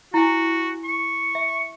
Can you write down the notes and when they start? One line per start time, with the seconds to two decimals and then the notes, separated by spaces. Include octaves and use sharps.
0.14 E4 F#4 G#5
0.84 C#6
1.35 E5